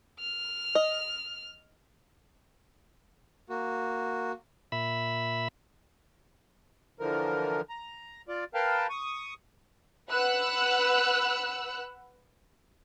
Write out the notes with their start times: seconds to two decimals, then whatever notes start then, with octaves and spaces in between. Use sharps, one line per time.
0.21 F6
0.75 D#5
3.49 A#3 F#4
4.72 A#2 E5 B5
7.00 D3 E3 F3 A#4
7.70 A#5
8.28 F4 D5
8.54 A#4 B4 F5 G5 A5
8.90 C#6 D#6
10.10 B4 F#5 E6 F#6